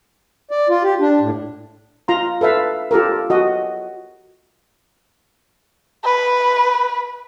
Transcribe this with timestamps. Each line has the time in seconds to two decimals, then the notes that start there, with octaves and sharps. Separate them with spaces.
0.51 D5
0.69 F4
0.83 G4
1.00 D4
1.20 A2
2.08 F4 A#5 C6
2.41 A4 B4 E5 F5
2.91 F4 G4 A4 A#4
3.30 F#4 D#5
6.04 B4